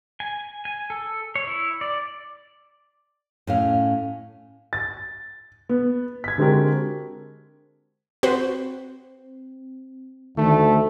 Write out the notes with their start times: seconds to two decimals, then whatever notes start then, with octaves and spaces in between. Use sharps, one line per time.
0.20 G#5
0.65 G#5
0.90 A4
1.35 C#5
1.47 E4
1.81 D5
3.47 A2 C#4 F5
4.73 A6
5.69 B3
6.24 G#6 B6
6.38 D3 G#3 C4 F#4 G4 A#4
8.23 C4 F#4 B4 C5
10.37 D2 D#3 A3